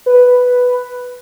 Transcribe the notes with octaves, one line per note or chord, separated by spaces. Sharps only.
B4